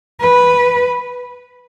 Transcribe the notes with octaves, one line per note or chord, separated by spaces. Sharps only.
B4